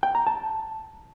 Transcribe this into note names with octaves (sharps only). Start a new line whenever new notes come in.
G5
A#5
A5